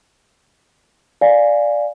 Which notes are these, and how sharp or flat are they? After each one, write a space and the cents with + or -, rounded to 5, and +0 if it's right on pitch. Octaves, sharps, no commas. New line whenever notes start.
D5 +0 F5 +0 G#5 +0